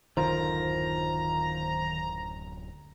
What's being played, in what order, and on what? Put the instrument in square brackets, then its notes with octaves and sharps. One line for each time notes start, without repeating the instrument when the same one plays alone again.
[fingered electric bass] D1 F#2 D3 [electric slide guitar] D#3 F4 A#4 [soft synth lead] C5 [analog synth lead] A#5